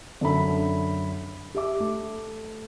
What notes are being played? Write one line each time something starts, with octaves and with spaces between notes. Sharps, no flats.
F#2 D3 A4 E5 B5
G4 E5 D6
A3